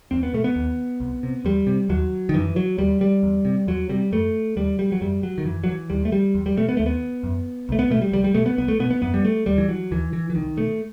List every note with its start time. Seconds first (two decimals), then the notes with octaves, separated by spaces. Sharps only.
0.11 E2 C4
0.23 B3
0.33 B2 A3
0.44 B3
0.56 D#2
1.00 C2
1.23 C3
1.45 E2 G3
1.67 C3
1.89 D#2 F#3
2.29 D#3
2.34 F#2 E3
2.56 F#3
2.78 D#2 G3
3.01 G3
3.23 E2
3.45 C3
3.68 E2 F#3
3.89 C3 G3
4.12 F#2 A3
4.56 D#2 G3
4.79 G3
4.92 F#3
5.01 F#2 G3
5.23 F#3
5.38 D#3
5.45 F#2 E3
5.64 F#3
5.68 E3
5.90 D#2 G3
6.05 A3
6.12 G3
6.35 E2
6.46 G3
6.57 B2 A3
6.69 B3
6.77 D#2 A3
6.86 B3
7.23 F#2
7.69 C2 A3
7.79 B3
7.90 B2 A3
8.02 G3
8.12 C2 G3
8.24 G3
8.34 B2 A3
8.46 B3
8.58 C2 B3
8.68 A3
8.79 B2 B3
8.90 B3
9.02 F#2 B3
9.14 G3
9.25 A3
9.46 D#2 G3
9.58 E3
9.69 F#3
9.91 D#2 E3
10.13 E3
10.30 E3
10.35 C2 D#3
10.57 B2 A3